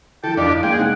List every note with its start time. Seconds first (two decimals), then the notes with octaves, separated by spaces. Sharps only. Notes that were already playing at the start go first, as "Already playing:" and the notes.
0.24 D3 F3 E4 A4 G5
0.37 F2 D4 D#4 G4 D5 D#5
0.63 C#2 G#3 A#3 F5 G5 D7
0.79 C3 C4 D#4 F#5